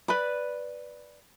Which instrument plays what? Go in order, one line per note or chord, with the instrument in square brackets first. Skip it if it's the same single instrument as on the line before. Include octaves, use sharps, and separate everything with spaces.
[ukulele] B4 D5 B5